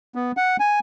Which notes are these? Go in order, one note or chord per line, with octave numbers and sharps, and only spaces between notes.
B3
F#5
G#5